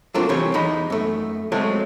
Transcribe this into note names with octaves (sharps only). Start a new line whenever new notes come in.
F#3 A3 A#3 C4 D4 F4
C2 E3 C4 G4 C#5
E2 D#4 B5
F#2 A3
F#3 G#3 A3 C4 C#5